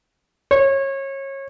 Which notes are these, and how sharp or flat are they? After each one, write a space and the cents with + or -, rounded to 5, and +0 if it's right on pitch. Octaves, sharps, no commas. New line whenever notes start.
C#5 -25